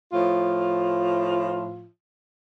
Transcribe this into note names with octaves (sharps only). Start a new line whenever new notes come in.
A2 F3 F4